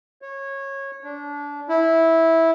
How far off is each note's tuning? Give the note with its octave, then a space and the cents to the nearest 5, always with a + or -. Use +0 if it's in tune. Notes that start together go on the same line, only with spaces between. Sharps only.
C#5 -20
D4 -25
E4 -10